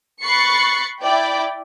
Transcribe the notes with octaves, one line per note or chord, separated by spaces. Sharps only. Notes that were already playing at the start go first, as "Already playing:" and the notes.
B5 C#6 F#6 A6 C7 C#7
E4 D5 G5